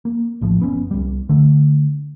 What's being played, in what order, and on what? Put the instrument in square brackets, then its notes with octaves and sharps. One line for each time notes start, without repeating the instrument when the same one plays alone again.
[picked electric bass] A#3
A#1 A2 F3
F#1 B3 C#4
C2 G3
D3 A3